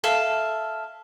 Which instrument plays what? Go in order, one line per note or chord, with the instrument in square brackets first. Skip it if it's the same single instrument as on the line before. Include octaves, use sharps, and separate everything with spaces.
[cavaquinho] A4 E5 F5